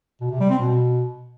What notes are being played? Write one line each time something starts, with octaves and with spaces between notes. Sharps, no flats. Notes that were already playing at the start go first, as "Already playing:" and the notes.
B2
C3
G3
C4
B2